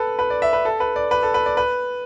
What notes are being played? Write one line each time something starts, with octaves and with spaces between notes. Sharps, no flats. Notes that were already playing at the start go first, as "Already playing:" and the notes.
Already playing: A4 B4
B4
D5
E5
B4
A4
B4
D5
B4
A4
B4
D5
B4